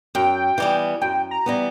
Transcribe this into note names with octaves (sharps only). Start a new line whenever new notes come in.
F#2 G5
E3 G3 B3
F#2 G5
A#5
E3 G3 B3